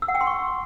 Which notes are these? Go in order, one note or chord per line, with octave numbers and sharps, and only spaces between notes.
E6
F#5
G5
C6
C#6